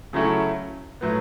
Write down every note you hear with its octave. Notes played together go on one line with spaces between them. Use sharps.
C#3 F#3 A3 C#4 E4
A2 F#3 B3